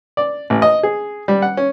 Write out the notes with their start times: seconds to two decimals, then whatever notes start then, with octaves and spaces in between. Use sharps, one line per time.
0.17 D5
0.50 A1
0.62 D#5
0.83 G#4
1.28 G3
1.42 F#5
1.57 C#4